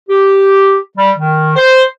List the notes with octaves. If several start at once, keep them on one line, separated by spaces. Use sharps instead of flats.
G4
G3
D#3
C5